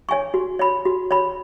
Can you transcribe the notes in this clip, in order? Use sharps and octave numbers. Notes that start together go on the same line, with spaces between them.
C#5 G#5 C#6
F#4
C#5 B5
F#4
C#5 B5